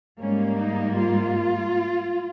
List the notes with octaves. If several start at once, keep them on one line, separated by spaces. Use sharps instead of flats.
G#2 G3 A#3 C#4
D#4
F4